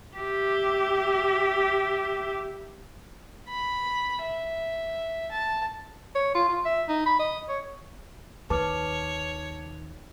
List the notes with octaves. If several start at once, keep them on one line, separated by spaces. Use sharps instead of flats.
G4 E5
B5
E5
A5
C#5
F4
F4
E5
D#4
B5
D#5
C#5
D#2 D#3 B4 C#5 A5 D6 F6